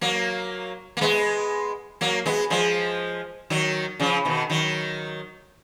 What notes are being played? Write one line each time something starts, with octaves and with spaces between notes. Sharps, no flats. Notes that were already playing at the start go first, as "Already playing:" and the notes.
F#3 A#3
A#3
G#3 B3
F#3 A#3
G#3 B3
F3 G#3
D#3 F#3
C#3 F3
B2 D#3
D#3 F#3